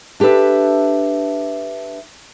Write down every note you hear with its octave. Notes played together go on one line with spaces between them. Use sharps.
D4 G4 A4 B4 E5